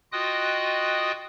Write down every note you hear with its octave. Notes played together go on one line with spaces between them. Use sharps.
F4 F#4 D#5 G5 D#6 F#6